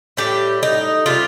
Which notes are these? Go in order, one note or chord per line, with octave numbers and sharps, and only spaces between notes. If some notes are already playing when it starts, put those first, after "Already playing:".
A2 G3 G4
D#4
C3 G3 F4